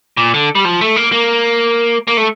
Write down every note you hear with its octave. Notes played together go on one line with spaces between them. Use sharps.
A#2
D3
G3
F3
A3
A#3
A#3
A#3
A3